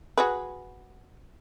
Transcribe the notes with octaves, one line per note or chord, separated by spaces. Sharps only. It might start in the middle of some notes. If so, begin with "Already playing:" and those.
F#4 G#4 B4